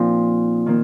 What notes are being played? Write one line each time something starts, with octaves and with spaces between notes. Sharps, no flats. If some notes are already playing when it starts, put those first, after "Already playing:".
Already playing: A#2 F3 C4 D#4
D#3 A#3